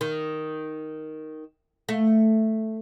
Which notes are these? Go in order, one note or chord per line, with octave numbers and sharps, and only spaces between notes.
D#3
A3